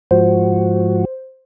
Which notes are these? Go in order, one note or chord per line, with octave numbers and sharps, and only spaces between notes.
G#2 F3 F#4 C5